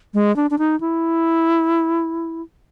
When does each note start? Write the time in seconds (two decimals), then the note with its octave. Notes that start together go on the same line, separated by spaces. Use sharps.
0.14 G#3
0.36 D4
0.51 D4
0.59 D#4
0.81 E4